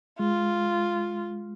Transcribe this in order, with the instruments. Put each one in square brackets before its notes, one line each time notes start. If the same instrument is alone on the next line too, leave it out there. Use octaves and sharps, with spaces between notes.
[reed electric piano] G#3 [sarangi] F4